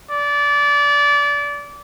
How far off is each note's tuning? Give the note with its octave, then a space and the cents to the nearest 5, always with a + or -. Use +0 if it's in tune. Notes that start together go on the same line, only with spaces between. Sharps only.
D5 -25